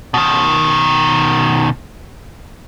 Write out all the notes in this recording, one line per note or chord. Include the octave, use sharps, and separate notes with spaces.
B2 D#3